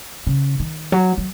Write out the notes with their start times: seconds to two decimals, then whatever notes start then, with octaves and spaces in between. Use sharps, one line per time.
0.27 C#3
0.60 D#3
0.92 F#3
1.18 F#3